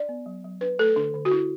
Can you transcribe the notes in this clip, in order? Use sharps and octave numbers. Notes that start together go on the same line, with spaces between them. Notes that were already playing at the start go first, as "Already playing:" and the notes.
Already playing: D4 D5
B3
F#3
F#3
D4 B4
A3 A4
D3 D4
D3
F#4
D4 E4